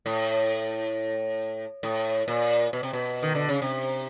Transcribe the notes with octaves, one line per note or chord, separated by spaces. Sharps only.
A2
A2
A#2
B2
C3
B2
D#3
D3
C#3
C3